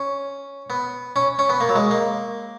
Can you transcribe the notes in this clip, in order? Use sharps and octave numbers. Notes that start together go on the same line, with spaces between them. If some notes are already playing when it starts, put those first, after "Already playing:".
Already playing: C#4
B3
C#4
C#4
B3
A#3
F#3
G#3
A#3